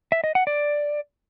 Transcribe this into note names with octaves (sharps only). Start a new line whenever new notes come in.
E5
D#5
F#5
D5